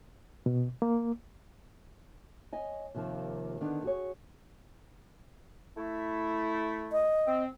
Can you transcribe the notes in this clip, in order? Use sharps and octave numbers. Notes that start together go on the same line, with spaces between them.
B2
A#3
C#5 D#5 G#5
D#2 C3 D#3 F3 F4
D3 D#3 B3 D4
F#4 G#4 C#5
A3 E4
D#5
C4